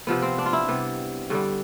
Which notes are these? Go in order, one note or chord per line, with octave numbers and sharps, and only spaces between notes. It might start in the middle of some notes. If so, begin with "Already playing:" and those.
C3 F3 B3
C4
D4
F4
E4
C3 G3 B3
G2 D3 G3